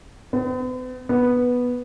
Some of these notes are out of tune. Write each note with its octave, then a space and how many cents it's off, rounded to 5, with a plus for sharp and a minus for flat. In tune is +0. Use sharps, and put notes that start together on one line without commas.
B3 +45
B3 -5